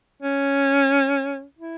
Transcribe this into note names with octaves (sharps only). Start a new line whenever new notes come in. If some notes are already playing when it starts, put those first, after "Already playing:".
C#4
E4